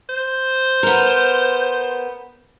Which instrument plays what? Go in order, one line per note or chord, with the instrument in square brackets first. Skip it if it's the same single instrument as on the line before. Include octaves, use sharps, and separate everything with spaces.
[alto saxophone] C5
[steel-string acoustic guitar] B3 A#4